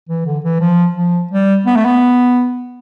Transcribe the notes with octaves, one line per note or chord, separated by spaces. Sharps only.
E3
D3
E3
F3
F3
G3
B3
A3
B3